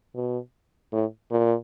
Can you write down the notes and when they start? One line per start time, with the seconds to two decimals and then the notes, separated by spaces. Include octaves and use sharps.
0.15 B2
0.93 A2
1.31 A#2